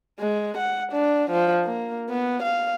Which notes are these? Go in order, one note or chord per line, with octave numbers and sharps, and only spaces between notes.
G#3
F#5
D4
F3
A#3
B3
F5